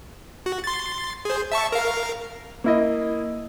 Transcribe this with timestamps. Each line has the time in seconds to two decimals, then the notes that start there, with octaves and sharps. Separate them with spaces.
0.46 F#4
0.64 C6 A6
1.25 G#4 C5
1.52 E5 A5 C#6
1.72 A#4 F5
2.64 A#3 E4 D#5